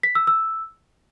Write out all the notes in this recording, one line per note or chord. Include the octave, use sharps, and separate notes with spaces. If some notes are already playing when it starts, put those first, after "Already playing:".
B6
E6
E6